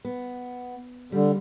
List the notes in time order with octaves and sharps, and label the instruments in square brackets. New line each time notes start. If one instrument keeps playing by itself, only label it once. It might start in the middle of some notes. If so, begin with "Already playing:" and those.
[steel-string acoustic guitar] B3
[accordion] D3 [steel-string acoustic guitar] G3